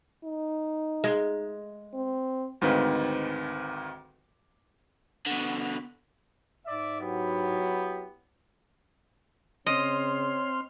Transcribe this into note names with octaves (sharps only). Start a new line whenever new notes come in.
D#4
G#3
C4
D2 G#2 D#3 C4 B4 F5
B2 D3
G#2 D5 E5
F#3 B3 E4 G4
C#3 C4 C#5 D#5 C6 F6